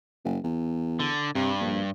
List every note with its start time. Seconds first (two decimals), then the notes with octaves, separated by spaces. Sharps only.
0.25 F#1
0.44 E2
1.00 D3
1.35 G2 C3
1.61 A#1